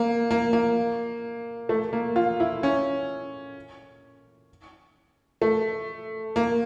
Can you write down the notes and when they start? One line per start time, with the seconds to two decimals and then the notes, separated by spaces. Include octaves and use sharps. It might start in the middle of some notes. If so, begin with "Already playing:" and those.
Already playing: A#3
0.31 A#3
0.53 A#3
1.69 A3
1.93 A#3
2.16 F4
2.40 E4
2.63 C#4
5.42 A3
6.36 A#3